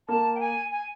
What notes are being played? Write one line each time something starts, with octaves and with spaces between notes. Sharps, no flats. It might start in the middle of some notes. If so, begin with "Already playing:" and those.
A#3 A5
G5
G#5
G#5